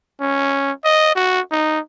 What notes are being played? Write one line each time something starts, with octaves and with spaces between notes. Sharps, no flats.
C#4
D#5
F#4
D#4